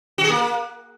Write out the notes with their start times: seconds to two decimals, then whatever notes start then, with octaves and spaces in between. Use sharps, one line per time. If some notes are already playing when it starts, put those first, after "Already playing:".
0.18 F#4
0.24 G#4
0.30 A#3